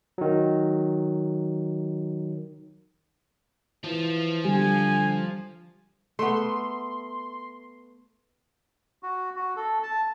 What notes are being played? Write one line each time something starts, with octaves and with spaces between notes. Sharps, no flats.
D#3 F#3
E3 F3
D3 G3 G#5
A3 B3 C6
F#4
F#4
A4
A5